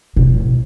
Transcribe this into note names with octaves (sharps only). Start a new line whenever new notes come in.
B2
A2